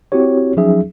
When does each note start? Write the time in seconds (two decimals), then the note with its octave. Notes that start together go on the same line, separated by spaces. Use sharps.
0.12 C4 E4 F#4 G4 C#5
0.57 F3 F#3 C#4 D#4 G#4 E5